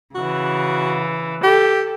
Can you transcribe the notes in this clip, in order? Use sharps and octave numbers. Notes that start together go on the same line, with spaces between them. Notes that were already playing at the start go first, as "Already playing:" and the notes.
C#3 E3 F#4
G4 A4